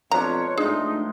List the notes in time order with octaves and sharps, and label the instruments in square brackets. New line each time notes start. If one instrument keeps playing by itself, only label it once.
[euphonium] F2 [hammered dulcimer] B2 F3 D4 [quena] C#5 [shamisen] A#5
[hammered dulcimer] A2 G#3 C6 [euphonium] D4 [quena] D#4 [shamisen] G#4